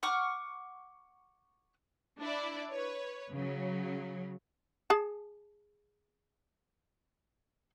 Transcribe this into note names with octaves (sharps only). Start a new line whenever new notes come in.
F#5 C#6 D6 F6
D4 E4 D5
B4 C#5
C#3 F#3
G#4 A5